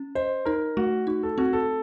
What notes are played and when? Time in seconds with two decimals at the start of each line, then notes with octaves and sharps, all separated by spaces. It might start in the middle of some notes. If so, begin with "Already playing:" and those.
Already playing: C#4
0.15 C5 D#5
0.45 D#4 A#4
0.77 A3 F#4
1.07 D#4 F#4
1.23 A4
1.38 C4 F#4
1.53 A4